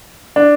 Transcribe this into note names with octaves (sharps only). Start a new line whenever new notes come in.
D4